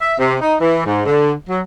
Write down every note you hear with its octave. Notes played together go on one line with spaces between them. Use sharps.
E5
C3
D#4
E3
G#2
D3
F#3